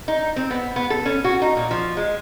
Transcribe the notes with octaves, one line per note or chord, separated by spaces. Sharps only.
D#4
C4
B3
B3
A4
C#4
F#4
D#4
A#2
F3
G#3